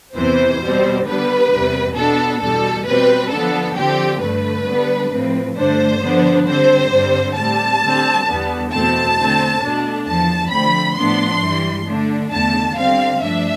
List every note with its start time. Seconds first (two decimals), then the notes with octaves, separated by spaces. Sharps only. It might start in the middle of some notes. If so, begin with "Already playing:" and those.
0.15 E2 C3 E3 C5
0.61 B2 G3 C4
1.05 D3 G3 B3 D4 B4
1.50 E2 C3 G3
1.95 B2 B3 D4 A4
2.40 E2 B2 G3 A4
2.85 B2 G3 C4 B4
3.30 D3 F3 B3 D4 A4
3.75 D3 F3 C4 G4
4.20 G2 D3 A3 B4
4.66 D3 G3 B3 D4
5.11 A2 F3 C4
5.56 G2 D3 A3 D4 C5
6.01 D3 F3 B3 D4
6.46 D3 G3 C4 C5
6.91 G2 D3 G3 C4
7.35 A2 G3 C4 A5
7.81 D3 G3 C4
8.26 E2 D3 G3 B3
8.71 E2 B2 A3 C4 A5
9.16 D3 A3 C4
9.61 B2 A3 D4
10.06 E2 D3 F3 A5
10.51 D3 F3 A3 C4 B5
10.97 A2 F3 B3 D4 C6
11.41 G2 E3 G3
11.86 D3 A3 D4
12.32 E2 D3 A3 A5
12.76 D3 G3 C4 F5
13.21 G2 F3 A3 D4 E5